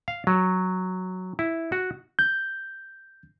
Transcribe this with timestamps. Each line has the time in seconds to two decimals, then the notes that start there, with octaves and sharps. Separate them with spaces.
0.08 F5
0.27 F#3
1.39 E4
1.72 F#4
2.19 G6